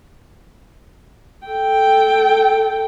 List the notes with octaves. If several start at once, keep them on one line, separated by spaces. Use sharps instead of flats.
A4 G5